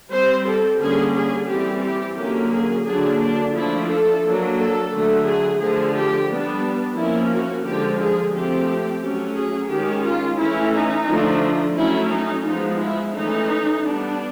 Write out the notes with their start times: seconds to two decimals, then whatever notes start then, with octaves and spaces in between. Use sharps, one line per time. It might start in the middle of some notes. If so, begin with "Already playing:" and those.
0.11 G3 C4 C5
0.46 A4
0.80 D3 G3 A#3 C#4 G#4
1.14 G#4
1.49 E3 G3 C4 G4
1.83 G4
2.17 D3 F#3 A#3 C#4 G4
2.52 G#4
2.86 D3 F#3 A#3 D4 G#4
3.20 D4
3.54 F3 A3 D4 E4
3.88 A4
4.23 F#3 A#3 D4
4.57 A4
4.91 D3 F#3 A3
5.26 G#4
5.59 D3 F3 A3 G#4
5.94 G4
6.28 G3 B3 D4
6.96 F3 A#3 C#4 E4
7.31 F#4
7.65 D3 F3 G#3 G4
8.00 G#4
8.34 F3 A3 C4 G4
9.02 F#3 A3 C#4
9.36 G#4
9.70 D#3 G#3 C#4 G4
10.05 F4
10.39 E3 A3 C#4 E4
10.73 D#4
11.08 D3 F3 A3 D4
11.76 F#3 A3 C#4 E4
12.10 D#4
12.45 F3 G#3 B3 D#4
12.79 E4
13.13 E3 A3 C#4 D#4
13.82 G3 B3 D4